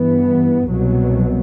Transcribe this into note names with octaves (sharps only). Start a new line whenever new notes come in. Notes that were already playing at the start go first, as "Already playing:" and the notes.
Already playing: G2 E3 B3
C2 B2 F#3